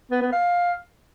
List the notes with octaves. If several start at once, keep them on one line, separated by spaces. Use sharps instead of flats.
B3
B3
F5